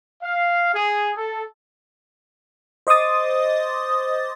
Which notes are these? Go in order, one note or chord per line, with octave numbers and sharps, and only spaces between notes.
F5
G#4
A4
C5 D#5 C6 D6 D#6 A6